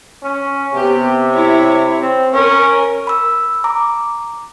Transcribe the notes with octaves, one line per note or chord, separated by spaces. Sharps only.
C#4
C3 B3 G4
E4 C#5
C4
C#4 A#4
B5 E6
A#5 D6